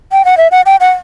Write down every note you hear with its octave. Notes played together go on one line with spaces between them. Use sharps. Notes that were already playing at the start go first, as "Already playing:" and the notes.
G5
F#5
E5
F#5
G5
F#5